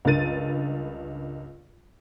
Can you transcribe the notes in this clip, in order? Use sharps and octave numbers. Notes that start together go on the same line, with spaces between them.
C#2 G2 A#4 A6 D#7